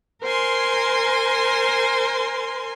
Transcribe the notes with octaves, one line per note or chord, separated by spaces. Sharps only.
A#4 C5 G#5 C6